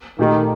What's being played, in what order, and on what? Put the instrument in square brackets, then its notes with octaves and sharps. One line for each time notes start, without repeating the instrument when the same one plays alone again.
[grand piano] A#2 A3 D#4 G4 [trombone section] D#3